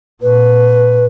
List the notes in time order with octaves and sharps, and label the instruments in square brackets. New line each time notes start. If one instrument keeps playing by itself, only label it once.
[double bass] A#2 [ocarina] B4